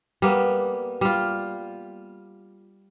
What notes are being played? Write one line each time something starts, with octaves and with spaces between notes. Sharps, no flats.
G3 A#3 B3
G3 F4